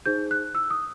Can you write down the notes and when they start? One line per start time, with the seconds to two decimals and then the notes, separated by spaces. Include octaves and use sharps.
0.06 D#4 G#4 C5 G6
0.31 F#6
0.55 E6
0.70 D#6